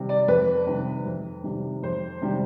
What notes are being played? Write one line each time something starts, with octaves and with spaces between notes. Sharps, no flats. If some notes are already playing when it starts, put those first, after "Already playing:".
Already playing: C3 D#3 G3
D5
F2 B4
C3 D#3 G3
F2
C3 D#3 G3
F2 C5
C3 D#3 G3